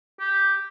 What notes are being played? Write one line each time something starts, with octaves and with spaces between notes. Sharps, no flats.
G4